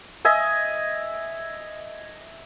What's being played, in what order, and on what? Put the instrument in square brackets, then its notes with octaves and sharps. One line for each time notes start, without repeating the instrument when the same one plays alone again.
[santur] D#5 E5 G#5